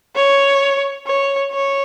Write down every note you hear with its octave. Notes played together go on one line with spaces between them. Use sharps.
C#5
C#5
C#5